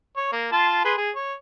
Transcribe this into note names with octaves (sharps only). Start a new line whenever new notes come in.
C#5
A#3
F4 A5 C6
G#4 B4 C6
G#4
C#5